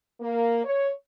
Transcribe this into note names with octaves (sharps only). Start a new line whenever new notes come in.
A#3
C#5